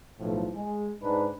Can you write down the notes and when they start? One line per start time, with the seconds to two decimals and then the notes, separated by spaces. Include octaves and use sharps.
0.19 B1 A2 F3
0.52 G#3
1.02 G#2 D4 B4